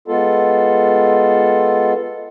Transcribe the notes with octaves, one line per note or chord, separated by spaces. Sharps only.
G#3 B3 F4 A4